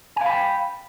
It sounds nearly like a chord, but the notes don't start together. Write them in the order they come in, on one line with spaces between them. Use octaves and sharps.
G#5 F5 B5 G5